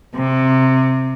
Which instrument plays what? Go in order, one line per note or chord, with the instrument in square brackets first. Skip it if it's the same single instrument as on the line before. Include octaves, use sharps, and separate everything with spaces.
[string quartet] C3